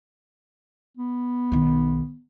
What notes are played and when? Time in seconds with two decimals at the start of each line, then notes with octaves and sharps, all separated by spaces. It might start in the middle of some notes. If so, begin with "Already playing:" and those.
0.97 B3
1.52 B1 D#3